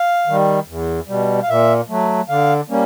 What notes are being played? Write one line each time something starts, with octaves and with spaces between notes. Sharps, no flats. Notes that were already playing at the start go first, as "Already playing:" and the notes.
Already playing: F5
D#3 G3
E2
B2 G3
F5
A#2 E5
F#3 A3
D3 F5
G3 A#3 C#4